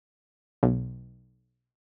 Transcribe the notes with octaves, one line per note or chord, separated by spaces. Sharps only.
B1